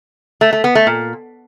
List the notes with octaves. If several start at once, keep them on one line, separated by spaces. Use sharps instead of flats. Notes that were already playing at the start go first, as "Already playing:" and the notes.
A3
A3
B3
A3
A#2